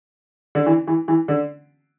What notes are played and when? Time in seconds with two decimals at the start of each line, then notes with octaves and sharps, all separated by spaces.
0.55 D3
0.66 E3
0.87 E3
1.08 E3
1.28 D3